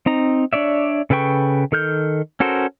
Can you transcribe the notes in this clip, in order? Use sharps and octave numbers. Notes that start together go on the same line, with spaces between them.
C4 D#4 A#5
D4 C#5 D5 E5
C#3 A4 B4 G5 C#6
D#3 A4 F6 G6
C#4 F#4 A4 A#4 C5